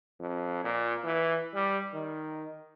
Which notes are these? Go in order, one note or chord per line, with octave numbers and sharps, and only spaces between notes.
F2
A#2
E3
G3
D#3